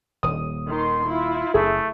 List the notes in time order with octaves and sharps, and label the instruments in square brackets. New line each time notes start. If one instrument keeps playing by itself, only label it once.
[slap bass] D#1 D#2 [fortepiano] D#6
[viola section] D#3 C6
[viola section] E4 [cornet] F4
[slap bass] F#1 [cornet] A3 [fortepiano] G#4